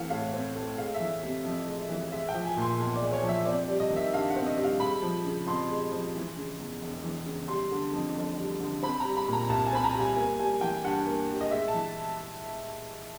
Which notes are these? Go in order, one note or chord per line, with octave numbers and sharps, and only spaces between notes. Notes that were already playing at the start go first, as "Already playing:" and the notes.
Already playing: E3 A3 C4 F5 F#5
A2 F5
C4
A3
G#3 F5
E5
E3
C3
F2
G#3
E3
G#3 E5
G5
F3
G#5
A#2
C6
B1
G#3 D5
C#5
F3
E5
C4 D5
D5
G3
D#5
D#3
E5
G2 F5
F#5
C4
D#5
G3
F5
G#3 B5
F3
C#3
F2 C6
G#3
F3
E3
C#3
E2
E1
E3
C#3
G3 C6
D3
F2
F1
G3
D3
C4 B5
G3 A#5
B5
A#2 A#5
C2 A5
G#5
C4 B5
A#5
G3
G#5
A#3 G#5
G3 G#5
E3 G5
G2 F#5
A#3
G3
D#5
G#3 E5
A5
E3